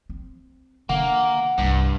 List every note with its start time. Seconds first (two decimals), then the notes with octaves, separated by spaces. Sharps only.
0.09 C4
0.89 D3 D#3 A#3 F#5
1.58 C2 G2 A#3